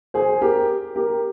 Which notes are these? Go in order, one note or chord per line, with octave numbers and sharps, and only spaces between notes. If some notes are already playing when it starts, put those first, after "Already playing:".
G#4 C5
G4 A#4
G4 A#4